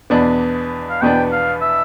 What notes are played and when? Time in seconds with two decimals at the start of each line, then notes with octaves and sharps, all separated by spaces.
0.10 E2 B2 B3 D4
0.90 F5
1.01 E2 B2 B3 D4 G5
1.32 F5
1.62 E5